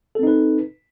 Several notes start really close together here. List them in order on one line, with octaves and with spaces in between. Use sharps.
A4 C4 D#4 B4